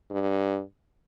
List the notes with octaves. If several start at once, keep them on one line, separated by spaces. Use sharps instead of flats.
G2